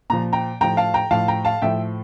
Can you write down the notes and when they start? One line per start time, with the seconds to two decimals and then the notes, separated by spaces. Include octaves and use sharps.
0.10 A#2 F3 A#5
0.33 G5 A#5
0.61 A2 F3 G5 A#5
0.77 F5 A5
0.94 G5 A#5
1.11 A2 F3 F5 A5
1.28 G5 A#5
1.45 F5 A5
1.62 A2 F3 E5 G5